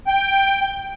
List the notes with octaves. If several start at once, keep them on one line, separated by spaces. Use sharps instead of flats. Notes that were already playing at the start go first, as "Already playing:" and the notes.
G5